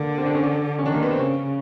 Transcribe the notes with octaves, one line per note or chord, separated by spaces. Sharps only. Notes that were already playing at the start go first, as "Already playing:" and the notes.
Already playing: D3 A#3
C4
D4
C#4
C#4
D#3 D4
A#3
B3
C4
C#3 C#4